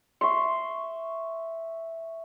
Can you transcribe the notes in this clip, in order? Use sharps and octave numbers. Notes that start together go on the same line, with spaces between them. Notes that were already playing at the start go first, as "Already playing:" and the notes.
E5 C6 C#6